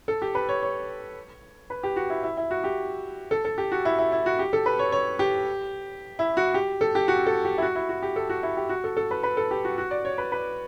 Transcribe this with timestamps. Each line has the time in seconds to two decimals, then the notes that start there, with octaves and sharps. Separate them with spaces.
0.08 A4
0.22 G4
0.35 B4
0.49 C#5
0.63 C#5
1.70 B4
1.83 G4
1.96 F#4
2.10 E4
2.23 E4
2.37 E4
2.51 F#4
2.64 G4
3.31 A4
3.45 A4
3.58 G4
3.72 F#4
3.85 E4
3.99 E4
4.12 E4
4.26 F#4
4.39 G4
4.53 A4
4.66 B4
4.79 C#5
4.92 C#5
5.19 G4
6.19 E4
6.37 F#4
6.54 G4
6.81 A4
6.95 G4
7.08 F#4
7.26 A4
7.45 G4
7.58 E4
7.62 F#4
7.75 E4
7.89 F#4
8.02 G4
8.16 A4
8.29 F#4
8.43 E4
8.57 G4
8.69 F#4
8.84 A4
8.97 A4
9.11 B4
9.23 B4
9.37 A4
9.51 G4
9.65 F#4
9.78 F#4
9.91 D5
10.05 C#5
10.18 B4
10.32 B4